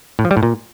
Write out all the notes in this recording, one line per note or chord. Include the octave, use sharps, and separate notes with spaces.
A2
F3
G3
A2
A#2